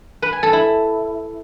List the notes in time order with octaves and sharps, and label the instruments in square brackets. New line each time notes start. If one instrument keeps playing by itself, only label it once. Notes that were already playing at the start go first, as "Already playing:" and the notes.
[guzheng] B4
G#5
A4
E4